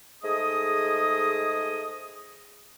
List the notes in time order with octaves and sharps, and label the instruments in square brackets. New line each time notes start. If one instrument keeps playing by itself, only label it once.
[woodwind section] G#2 A3 G#4 D#5 D#6